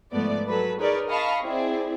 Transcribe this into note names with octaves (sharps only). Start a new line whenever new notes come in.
G#2 F3 A3 B3 D5
F#3 A4 B4
D#4 G#4 A#4 B4 C#5 D5
D#5 F5 A5 B5 C#6 F6
C4 E4 G#4 D5